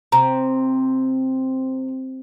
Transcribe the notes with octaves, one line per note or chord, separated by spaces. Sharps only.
C3 A#5